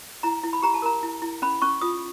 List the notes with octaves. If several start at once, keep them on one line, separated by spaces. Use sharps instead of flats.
E4 A#5
E4
B5
G4 A#5
A5
A#4 A#5
E4
E4
C#4 B5
C#4 C#6
F4 D#6